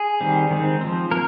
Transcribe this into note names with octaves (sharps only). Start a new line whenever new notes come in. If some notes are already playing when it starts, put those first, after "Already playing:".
Already playing: G#4
D#3 G3 C4
D#3 G#3 C4
F3 C4
A#3 A#4